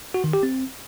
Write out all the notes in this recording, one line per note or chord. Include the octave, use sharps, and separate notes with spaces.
F#4
D#3
G4
C4